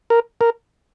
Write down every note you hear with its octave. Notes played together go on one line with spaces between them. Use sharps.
A#4
A#4